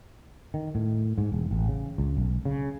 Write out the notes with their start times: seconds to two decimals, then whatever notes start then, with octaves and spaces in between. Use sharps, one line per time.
0.54 D#3
0.75 A2
1.18 G#2
1.32 E1
1.51 A1
1.68 C#3
1.98 C#2
2.17 B1
2.45 C#3